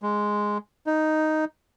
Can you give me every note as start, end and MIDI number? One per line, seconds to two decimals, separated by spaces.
0.02 0.58 56
0.86 1.45 63